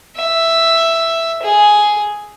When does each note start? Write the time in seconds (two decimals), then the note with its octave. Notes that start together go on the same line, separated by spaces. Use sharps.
0.16 E5
1.43 G#4